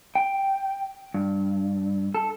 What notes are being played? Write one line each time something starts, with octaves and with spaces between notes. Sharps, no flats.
G5
G2
A4